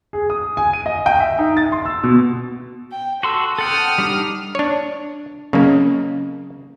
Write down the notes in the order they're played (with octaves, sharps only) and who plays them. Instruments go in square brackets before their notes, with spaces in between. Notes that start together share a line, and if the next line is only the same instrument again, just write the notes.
[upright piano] G#4
D#6
G#5
D#7
D#5
G5
E5
D#4
A6
C6
E6
B2
[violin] G5
[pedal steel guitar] F#4 C6 E6 [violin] A4
[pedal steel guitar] A4 F#5 G5 [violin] D#6 F6
[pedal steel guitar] G3 D4 D#4
[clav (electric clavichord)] D4 C#5
[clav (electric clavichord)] C#3 A#3 [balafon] F#3 C4 C#4